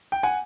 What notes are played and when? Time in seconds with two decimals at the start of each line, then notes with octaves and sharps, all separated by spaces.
0.12 G5
0.23 F#5 G#5